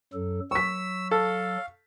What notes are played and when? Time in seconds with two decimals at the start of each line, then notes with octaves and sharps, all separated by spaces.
0.13 F#2 F#3 A4
0.51 F#3 C#6 E6 B6
1.11 A4 F5